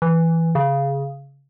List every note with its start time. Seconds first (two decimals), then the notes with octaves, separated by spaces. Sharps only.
0.02 E3
0.55 C#3